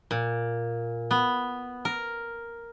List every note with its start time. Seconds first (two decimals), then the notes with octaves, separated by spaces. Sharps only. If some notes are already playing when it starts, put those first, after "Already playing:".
0.11 A#2
1.11 B3
1.85 A#4